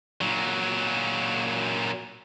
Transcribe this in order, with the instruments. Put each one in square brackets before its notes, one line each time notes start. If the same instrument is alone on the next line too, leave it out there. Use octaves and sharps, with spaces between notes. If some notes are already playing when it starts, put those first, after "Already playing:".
[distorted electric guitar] A#2 F#3